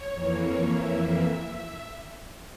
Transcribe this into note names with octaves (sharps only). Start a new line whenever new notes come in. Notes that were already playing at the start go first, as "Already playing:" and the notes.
Already playing: C#5
F2 E3 A#3
E5